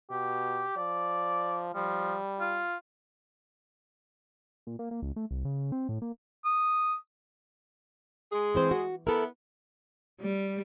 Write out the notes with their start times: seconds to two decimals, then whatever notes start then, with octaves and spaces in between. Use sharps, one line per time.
0.11 B2 G4
0.77 F3 D5
1.75 F3 G3
2.40 F4
4.67 A#2
4.79 A#3
4.91 A#3
5.02 C#2
5.16 A3
5.31 C2
5.45 C#3
5.72 C4
5.89 A2
6.02 A#3
6.45 D#6
8.31 G#3 G#4
8.55 E3 C4 C5
8.71 F#4
9.07 B3 E4 A4 A#4
10.21 G3